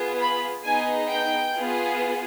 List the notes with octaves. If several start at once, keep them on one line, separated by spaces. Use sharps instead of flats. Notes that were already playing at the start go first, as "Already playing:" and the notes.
Already playing: B3 F4 G#4
B5
B3 D#4 G#4 G#5
G5
B3 F4 G#4